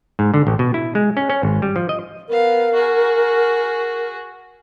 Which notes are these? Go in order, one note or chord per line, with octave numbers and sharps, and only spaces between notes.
G#2
D3
A1
B2
E4
G#3
C#4
C#4
G#1
G3
F3
D#5
B3 A#4 F5
F#4 G#4